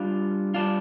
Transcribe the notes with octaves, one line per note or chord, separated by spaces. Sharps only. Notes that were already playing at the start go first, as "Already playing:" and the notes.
Already playing: G3 D4 F4
G3 D4 F4